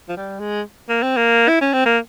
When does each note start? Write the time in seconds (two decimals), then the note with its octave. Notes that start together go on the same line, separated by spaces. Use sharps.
0.09 F3
0.17 G3
0.40 G#3
0.89 A#3
1.03 C4
1.17 A#3
1.48 E4
1.61 C#4
1.73 C4
1.86 A#3